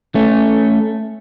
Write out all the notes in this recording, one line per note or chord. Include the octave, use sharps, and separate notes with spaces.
A3 C#4